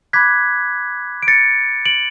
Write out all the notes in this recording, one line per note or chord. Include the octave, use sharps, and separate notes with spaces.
B5 D6 F#6 G#6 B6
D7
A6 C#7
D7 F#7